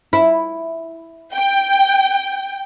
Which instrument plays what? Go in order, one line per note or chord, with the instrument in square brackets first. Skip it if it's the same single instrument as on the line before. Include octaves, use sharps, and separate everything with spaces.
[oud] E4
[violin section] G5